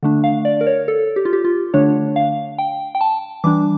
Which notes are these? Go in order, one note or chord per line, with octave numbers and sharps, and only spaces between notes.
D3 A3 D4
F5
D5
A#4
C#5
A4
G4
F4
G4
F4
D3 A3 D4 C#5
F5
G5
G5
A5
E3 G3 D4 D6